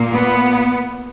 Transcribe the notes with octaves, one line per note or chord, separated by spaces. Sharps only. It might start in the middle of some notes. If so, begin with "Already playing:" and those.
Already playing: A#2 A#3
B3